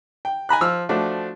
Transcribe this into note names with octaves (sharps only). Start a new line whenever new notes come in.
G5
G#5 A#5 B5 F#6
F3 E6 F6
F3 A3 D4 F#4